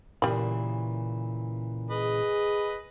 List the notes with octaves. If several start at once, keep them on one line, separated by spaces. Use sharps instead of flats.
A#2 C#3 E3 G3 B5
G#4 B4 D#5